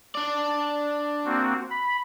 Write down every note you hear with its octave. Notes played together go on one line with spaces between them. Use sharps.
D4 D5
A#3 C4 F#4
B5